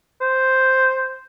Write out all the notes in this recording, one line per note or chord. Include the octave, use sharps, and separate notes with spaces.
C5